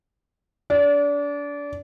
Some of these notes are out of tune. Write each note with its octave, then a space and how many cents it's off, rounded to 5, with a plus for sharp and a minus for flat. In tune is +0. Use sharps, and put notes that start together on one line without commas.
D4 -30